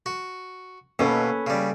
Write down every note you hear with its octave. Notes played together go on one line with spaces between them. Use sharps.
F#4
D#2 B2 A#3 C#4 A4 B4
C#3 G3